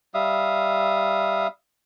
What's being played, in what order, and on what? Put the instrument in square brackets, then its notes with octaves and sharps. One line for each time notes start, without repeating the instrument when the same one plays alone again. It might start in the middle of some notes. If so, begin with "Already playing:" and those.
[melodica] G3 E5 F5 D#6